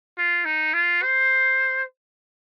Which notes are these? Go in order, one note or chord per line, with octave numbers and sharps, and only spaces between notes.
F4
D#4
F4
C5